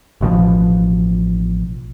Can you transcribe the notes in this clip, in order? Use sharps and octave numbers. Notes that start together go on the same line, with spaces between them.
A1 B2 D3 F3